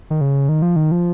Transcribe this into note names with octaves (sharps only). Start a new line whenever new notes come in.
D#3
C#3
D#3
F3
D#3
F3